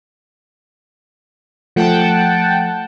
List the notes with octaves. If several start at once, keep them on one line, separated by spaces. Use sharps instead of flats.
F3 A3 F#5 G5 A5